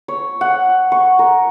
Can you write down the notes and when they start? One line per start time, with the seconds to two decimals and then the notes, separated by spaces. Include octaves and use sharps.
0.08 C#5
0.41 F#5
0.92 C#6
1.19 A#4